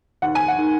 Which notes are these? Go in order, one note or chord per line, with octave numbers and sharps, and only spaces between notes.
D#2 F#5
G#5
F#5
D#3